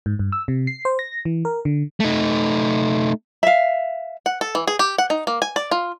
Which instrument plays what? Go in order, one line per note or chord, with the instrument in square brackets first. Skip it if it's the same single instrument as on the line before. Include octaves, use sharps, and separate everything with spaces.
[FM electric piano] G#2
G2
E6
C3
C7
C5
A#6
E3
A#4
D3
[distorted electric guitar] A3 D#4
[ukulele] E5 F5
[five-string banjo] F#5
A4
E3
G#4
G4
F#5
D#4
A#3
G#5
D5
F4